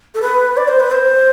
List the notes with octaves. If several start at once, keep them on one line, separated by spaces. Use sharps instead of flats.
A4
B4
D5
C5
B4
C5